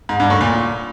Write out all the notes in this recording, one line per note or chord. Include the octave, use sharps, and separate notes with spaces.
G#2
G2
A2
A#2